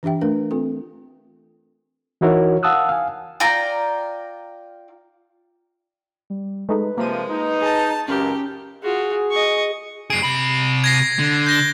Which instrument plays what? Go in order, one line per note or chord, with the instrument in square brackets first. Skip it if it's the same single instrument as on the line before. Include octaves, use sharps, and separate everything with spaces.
[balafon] E3 D4 G4 E5 G5
A3 D4 A#4 B4
C4 F4 A4
[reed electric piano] E3 D#4 E4 F#4 A#4 C#5
F5 F#5 A5 D#6 E6 F#6
F5 G#5
[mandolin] F4 D5 G5 A#5
[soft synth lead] G3
[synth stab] G#3 A3 D#4 [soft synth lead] B4
[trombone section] C3 F3 [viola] G#3 [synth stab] A#3 D#7
[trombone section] D#4
[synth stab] G#4 [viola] A5
[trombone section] C#2 F#2 A#4 [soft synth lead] C#4 [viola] G4
[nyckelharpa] F4 F#4 [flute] G#4
[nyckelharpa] D#5 C#6
[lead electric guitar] F#2 G#4 [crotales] C7 D7
[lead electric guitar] C3 B5
[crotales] G#6 A#6 C7
[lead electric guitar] D3
[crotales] G6 A#6 G7